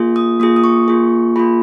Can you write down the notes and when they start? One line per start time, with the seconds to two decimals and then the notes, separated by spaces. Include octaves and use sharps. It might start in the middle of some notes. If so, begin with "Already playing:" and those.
Already playing: A#3 F4 G#4
0.16 D#6
0.40 A#3 F4 G#4 D#6
0.56 D#6
0.64 C#6
0.88 A#3 F4 G#4
1.36 A#3 F4 G#4 B5